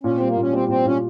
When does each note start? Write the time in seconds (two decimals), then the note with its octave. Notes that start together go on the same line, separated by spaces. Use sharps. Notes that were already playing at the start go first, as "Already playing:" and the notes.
0.03 A#2 C#4
0.16 G3 C4
0.28 A#3
0.36 A#2 C#4
0.53 G3 C4
0.69 A#2 C4
0.85 A#2 C#4